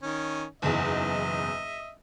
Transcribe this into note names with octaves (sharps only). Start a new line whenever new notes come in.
D#3 C#4
F#1 B1 E2 D#5 E5